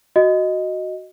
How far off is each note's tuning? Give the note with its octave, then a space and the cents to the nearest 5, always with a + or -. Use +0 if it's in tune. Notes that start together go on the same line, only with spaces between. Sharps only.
F#4 +0 D#5 +0